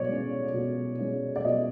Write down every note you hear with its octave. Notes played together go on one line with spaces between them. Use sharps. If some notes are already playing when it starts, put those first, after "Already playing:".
Already playing: B2 C#5 D5
G#3 C#4
B2
G#3 C#4
D5
B2 D#5